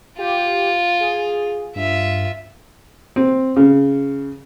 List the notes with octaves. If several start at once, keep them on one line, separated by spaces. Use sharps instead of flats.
F4 G4
G#4
G2 F4 E5
C4
C#3